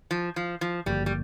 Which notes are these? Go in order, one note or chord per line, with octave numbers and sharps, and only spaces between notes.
F3
F3
F3
G#1 G2 D3 F3 G3 A#3
G3